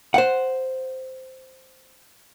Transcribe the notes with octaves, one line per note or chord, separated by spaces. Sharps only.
C5 F#5